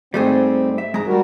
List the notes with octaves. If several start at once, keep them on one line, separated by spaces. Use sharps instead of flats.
G#2 G3 A3 C4 G#4
E5
G#2 G#3 A#5
G3 F#4 A#4